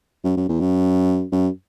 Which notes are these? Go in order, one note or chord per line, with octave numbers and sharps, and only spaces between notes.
F#2
F#2
E2
F#2
F#2